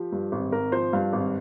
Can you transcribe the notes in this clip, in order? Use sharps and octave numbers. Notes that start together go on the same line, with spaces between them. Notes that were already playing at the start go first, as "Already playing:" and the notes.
Already playing: F3 G4
G2
G#1
G#1 A#4
F3 C5
G2 F5
G#1